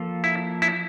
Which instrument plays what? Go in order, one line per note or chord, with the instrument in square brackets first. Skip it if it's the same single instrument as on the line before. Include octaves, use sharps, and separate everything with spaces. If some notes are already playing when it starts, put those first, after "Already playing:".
Already playing: [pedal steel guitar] F3 A#3 F4 A4
[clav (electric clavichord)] E4
E4